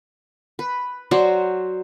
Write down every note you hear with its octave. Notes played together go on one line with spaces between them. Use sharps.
B4
F#3 F#4 C5 D5